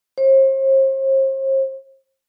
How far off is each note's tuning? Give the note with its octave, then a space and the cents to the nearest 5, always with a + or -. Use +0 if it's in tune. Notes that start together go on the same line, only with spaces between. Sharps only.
C5 +40